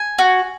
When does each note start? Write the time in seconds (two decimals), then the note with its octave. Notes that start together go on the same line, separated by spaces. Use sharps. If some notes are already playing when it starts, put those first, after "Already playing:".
Already playing: G#5
0.18 F#4